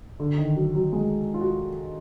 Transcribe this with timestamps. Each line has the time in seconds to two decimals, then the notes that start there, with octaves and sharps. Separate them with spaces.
0.20 D3
0.38 D#3
0.56 F#3
0.75 F#3
0.93 G#3
1.34 F4
1.41 F#4